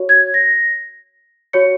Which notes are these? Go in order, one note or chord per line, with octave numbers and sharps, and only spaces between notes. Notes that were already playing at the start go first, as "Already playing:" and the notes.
Already playing: F#4 C#5
G#6
A#6
F#4 C#5 C#7